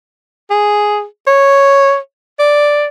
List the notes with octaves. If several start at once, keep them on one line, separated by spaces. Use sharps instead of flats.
G#4
C#5
D5